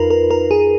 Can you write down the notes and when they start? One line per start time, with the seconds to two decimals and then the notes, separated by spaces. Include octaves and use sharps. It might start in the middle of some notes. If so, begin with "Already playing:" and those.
Already playing: F2 D#4 F4 A#4 B4
0.10 A#4
0.31 A#4
0.51 G#4